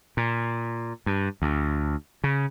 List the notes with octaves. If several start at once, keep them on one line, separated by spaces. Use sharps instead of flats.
A#2
G2
D2
C#3